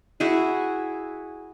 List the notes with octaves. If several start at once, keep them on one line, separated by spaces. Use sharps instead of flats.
E4 F#4 G#4